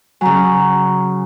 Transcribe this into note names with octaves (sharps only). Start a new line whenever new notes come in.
C#3 F#3 G#5 A#5 C#6